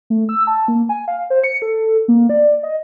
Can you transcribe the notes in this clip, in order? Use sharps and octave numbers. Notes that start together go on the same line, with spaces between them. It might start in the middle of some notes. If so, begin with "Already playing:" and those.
A3
E6
A5
A#3
G#5
F5
C5
C#7
A4
A#3
D5
D#5